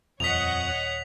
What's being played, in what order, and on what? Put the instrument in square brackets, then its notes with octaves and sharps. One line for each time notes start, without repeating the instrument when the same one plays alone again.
[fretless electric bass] D#1 [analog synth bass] F2 [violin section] C#5 D#5 F#5 [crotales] B6 F7